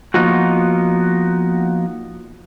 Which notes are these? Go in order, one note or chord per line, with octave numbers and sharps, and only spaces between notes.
F3 A#3 B3 D#4 F4 F#4